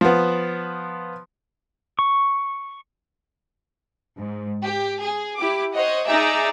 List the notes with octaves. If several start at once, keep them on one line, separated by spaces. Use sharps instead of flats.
F3 B3
C#6
G#2
G4
G#4
E4 G4 D6
C5 C#5 D#5 F#5
D#4 G#4 D5 E5 A#5